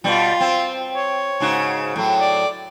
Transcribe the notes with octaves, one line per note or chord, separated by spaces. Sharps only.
B2 G3 F4
C4
C#5
G#2 C#3 F#4
A2 F#3
D5